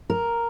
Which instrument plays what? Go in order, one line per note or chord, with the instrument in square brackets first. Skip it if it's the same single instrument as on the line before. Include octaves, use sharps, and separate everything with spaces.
[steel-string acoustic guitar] A#4